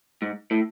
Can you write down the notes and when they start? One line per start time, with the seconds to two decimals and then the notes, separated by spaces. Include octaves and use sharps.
0.22 G#2
0.51 A2